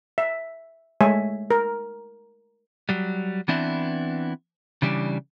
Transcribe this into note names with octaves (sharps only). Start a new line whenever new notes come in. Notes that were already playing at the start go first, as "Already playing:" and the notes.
E5
G#3 A3 C#5 E5 G#5
A#4
F#3 G3
E3 B3 C4 D4 E4
C#3 E3 G3 D4